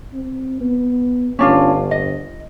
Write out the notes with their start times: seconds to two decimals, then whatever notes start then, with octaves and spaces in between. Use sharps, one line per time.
0.14 C4
0.61 B3
1.39 G1 C#4 D4 F4
1.91 D#5